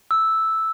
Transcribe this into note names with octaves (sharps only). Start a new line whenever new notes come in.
E6